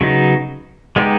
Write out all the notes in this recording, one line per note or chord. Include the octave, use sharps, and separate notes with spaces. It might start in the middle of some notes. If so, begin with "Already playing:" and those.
C#3 F#3 B3 D#4
G#3 B3 D#4 G4